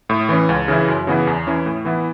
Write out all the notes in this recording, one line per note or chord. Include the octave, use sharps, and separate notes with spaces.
A2
E3 C#4
C#2
C#3 E3 C#4 E4
F#2
C#3 E3 B3 E4
E2
E3 C#4 E4
A2
E3 B3 E4